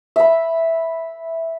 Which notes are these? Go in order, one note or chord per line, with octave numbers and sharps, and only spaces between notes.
E5 B5